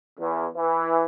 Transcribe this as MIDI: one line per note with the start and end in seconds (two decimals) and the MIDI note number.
0.20 0.46 40
0.55 1.06 52